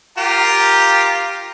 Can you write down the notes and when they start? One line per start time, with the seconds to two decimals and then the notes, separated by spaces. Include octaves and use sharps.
0.18 F4 G4 A#4